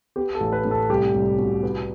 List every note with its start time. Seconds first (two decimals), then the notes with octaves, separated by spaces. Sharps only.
0.16 B3 G4
0.35 A4
0.40 A1
0.52 B4
0.65 A2
0.71 A4
0.89 C2 G4
1.14 C2
1.38 B2
1.63 B3